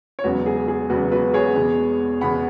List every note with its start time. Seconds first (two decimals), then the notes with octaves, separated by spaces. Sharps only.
0.19 C#5
0.24 E1 E2 C#3 F#3 B3 F#4 B4
0.46 G#4
0.68 G#4
0.90 E1 E2 C#3 F#3 B3 F#4 B4
1.12 F#4 B4
1.34 G#4 C#5
1.56 E2 B2 G#3 B3
2.21 E2 B2 G#3 B3 F#5 B5